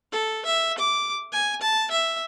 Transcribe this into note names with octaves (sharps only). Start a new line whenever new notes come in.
A4
E5
D6
G#5
A5
E5